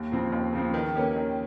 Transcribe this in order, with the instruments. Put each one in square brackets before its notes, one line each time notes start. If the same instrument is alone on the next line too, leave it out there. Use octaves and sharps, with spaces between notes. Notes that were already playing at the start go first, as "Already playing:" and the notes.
Already playing: [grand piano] D#2
C#3 F3 C4
D#2
C#3 F3 C4
D#3
A#3 C#4 G4
D#3